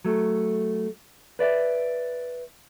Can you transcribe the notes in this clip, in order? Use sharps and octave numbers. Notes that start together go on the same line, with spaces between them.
F#3 A3
B4 D5 E5